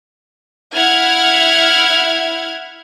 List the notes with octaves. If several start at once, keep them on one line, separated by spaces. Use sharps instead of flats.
E4 F#5 F6 G#6